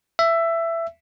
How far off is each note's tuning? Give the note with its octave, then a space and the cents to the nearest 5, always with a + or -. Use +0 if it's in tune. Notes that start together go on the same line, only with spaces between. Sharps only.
E5 +15